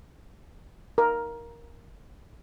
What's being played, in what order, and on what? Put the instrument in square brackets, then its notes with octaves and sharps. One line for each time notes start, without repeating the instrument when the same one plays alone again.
[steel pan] A#4